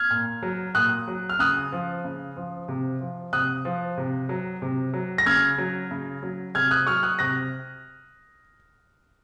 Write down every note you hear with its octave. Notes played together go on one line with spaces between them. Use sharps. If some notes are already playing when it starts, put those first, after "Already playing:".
Already playing: F6 G#6
A#2
F#3
A#2 D#6 F#6
F#3
F6
C#3 D#6 F#6
F3
C#3
F3
C3
F3
C3 D#6 F#6
F3
C3
F#3
C3
F#3
A#6
C#3 F6 G#6
F#3
C#3
F#3
C3 F6 G#6
D#6 F#6
F#3 C#6 F6
D#6 F#6
C3 F#6 A#6